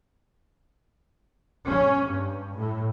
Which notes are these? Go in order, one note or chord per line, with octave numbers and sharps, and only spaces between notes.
C#4
G2
A2